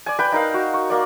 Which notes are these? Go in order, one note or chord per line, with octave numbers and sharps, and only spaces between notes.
D5 G#5
B4 G5 B5
D#4 A#4 F5
F#4
C#6
A#3 D5